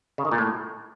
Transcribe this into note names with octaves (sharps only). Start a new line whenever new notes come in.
C#3
D#3
A#2
A2